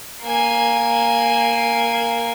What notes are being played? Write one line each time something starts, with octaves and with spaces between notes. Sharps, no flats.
A#3 G#5